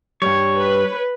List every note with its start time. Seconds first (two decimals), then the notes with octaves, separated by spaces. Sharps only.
0.22 G2 G3 C#5
0.58 B4